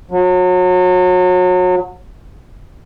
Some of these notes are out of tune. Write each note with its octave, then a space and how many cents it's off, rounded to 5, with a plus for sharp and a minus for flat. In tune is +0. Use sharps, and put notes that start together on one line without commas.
F#3 -30